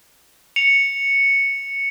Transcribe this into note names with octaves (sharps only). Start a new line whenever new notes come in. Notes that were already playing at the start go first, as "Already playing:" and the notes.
C#7 F7